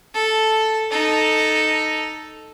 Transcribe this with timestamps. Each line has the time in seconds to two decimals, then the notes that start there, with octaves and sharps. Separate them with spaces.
0.14 A4
0.91 D#4 A4